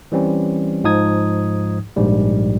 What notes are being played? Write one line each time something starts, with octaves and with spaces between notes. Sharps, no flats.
E3 G3 C4 C#4
G#2 F3 D#4 D#6 G#6
A#1 G#2 G3